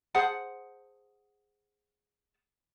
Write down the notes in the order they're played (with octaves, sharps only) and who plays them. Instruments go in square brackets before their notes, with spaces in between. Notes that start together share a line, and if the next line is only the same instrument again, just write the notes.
[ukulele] G#4 C5 F#5 A5